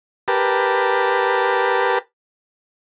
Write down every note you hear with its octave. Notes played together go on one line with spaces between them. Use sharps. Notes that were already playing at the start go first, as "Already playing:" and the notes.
G4 A#4 B4 A5